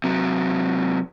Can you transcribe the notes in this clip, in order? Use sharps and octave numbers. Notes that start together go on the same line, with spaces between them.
C3 F#3